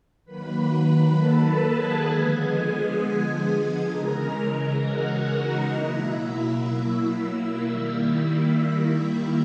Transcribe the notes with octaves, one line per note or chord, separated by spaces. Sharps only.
D#3 F#3 A#3 B4 B5
A4 A5
G#4 G#5
D3 F3 G#3 B3
C#3 E3 G#3 A#4 A#5
F#4 F#5
D#4 D#5
B2 F#3 A#3 E4 E5
D#3 G3 A#3